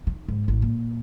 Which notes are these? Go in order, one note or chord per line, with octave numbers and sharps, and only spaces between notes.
D#3
G#2
A1
A#2